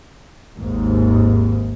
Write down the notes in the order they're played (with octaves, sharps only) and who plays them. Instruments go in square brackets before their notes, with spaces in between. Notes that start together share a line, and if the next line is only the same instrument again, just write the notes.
[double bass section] G#1 D#2 G#2